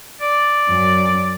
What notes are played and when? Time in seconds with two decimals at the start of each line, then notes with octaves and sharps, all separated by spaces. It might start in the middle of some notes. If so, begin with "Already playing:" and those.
0.21 D5
0.68 F#2